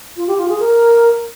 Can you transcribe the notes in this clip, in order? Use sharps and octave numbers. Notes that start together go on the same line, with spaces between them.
F4
G4
F4
G#4
A#4